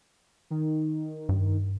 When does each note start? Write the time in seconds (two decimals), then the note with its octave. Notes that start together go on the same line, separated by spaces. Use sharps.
0.50 D#3
1.29 G2